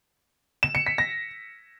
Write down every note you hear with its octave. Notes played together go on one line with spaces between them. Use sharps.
E7
C#7
B6
A#6